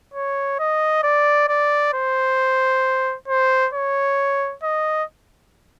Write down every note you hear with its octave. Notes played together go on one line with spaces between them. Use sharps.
C#5
D#5
D5
D5
C5
C5
C#5
D#5